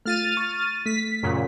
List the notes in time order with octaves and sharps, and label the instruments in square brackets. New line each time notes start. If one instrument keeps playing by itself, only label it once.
[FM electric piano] A3 F4 [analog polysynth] F6 A6 D#7
[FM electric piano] C#6
[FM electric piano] A3 [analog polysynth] B6
[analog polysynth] F#2 A#2 C#3